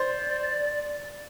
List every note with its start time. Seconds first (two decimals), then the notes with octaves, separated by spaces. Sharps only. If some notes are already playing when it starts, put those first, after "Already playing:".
Already playing: C5 D5
0.71 D5